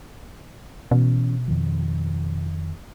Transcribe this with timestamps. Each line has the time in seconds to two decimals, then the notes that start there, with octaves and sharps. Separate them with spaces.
0.91 B2 E3 C#4
1.48 F2 D#3 F3